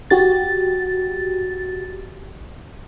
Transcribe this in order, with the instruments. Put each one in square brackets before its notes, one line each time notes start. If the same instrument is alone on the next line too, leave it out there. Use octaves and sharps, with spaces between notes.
[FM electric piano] F#4 G4 A6